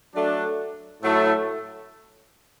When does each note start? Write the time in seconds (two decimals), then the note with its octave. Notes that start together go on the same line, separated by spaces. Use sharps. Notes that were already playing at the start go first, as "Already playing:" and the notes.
0.14 F#3 A3 D4
1.01 A2 F#3 A3 E4